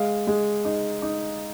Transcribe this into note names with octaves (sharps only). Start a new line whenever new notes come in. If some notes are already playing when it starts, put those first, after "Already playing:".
Already playing: G#3 F5
G#3
D#4
D#4